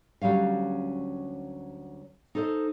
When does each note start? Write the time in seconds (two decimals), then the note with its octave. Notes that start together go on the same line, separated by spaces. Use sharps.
0.22 D2 F#3 G3 C#4 F5
2.35 D#4 A4 C5 D#5